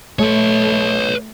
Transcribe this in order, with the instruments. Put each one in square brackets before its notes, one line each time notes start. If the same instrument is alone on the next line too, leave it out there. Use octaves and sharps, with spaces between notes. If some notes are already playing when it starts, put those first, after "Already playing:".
[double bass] A3 [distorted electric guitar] B4 C#5